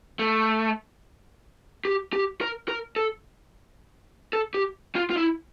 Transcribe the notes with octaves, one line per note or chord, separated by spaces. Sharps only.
A3
G4
G4
A#4
A#4
A4
A4
G4
F4
F4
E4